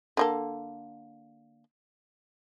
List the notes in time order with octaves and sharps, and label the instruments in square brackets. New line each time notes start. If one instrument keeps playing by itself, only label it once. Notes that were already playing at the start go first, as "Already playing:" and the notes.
[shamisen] D3 A#3 A4